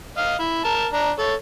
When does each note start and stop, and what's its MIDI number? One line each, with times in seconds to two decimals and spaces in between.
0.17 0.35 75
0.17 0.35 77
0.39 0.62 64
0.64 0.85 70
0.64 0.85 81
0.93 1.10 62
0.93 1.10 82
1.19 1.33 69
1.19 1.33 73